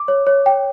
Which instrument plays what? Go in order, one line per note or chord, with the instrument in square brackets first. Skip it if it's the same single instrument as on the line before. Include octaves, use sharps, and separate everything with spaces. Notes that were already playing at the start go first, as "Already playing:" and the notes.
Already playing: [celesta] D6
C#5
C#5
G5